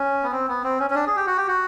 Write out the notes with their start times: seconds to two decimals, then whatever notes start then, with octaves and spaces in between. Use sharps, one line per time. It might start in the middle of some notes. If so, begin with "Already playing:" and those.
Already playing: C#4
0.23 B3
0.32 C4
0.48 B3
0.64 C4
0.80 C#4
0.90 C#4
0.95 D4
1.07 G#4
1.16 G4
1.27 F#4
1.37 G4
1.48 F#4